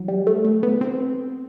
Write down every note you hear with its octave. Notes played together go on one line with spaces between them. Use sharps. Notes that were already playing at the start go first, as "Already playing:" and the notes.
Already playing: E3 F#3
G3
A3
A3
B3
C4